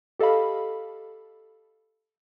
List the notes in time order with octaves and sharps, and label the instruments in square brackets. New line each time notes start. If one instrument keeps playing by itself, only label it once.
[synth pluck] G4 A4 D#5 F5 B5